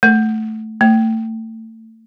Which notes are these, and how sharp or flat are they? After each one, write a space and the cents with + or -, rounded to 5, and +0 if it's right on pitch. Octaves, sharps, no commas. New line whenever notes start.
A3 -5
A3 +30